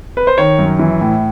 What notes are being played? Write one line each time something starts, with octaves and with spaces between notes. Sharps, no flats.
B4
C5
D#3 C#5
F#2
E3
A2